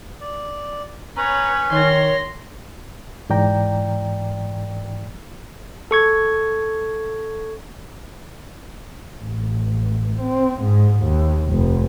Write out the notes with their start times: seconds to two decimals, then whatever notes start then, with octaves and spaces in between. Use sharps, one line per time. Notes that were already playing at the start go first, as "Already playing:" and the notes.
0.21 D5
1.16 C#4 B4 C#5 A#5
1.71 D#3 C#5 C6 A#6
3.30 G#2 E3 D5 G5 A#5
5.91 A4 C#6 G#6
9.20 A1
10.21 C4
10.62 G#2
11.01 D#2
11.49 F1